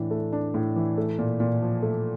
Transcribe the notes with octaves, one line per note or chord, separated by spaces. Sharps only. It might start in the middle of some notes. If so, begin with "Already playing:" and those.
Already playing: A2 E3 D4
A3
D4
A2
E3
A3
A#2
A#2
F3
A3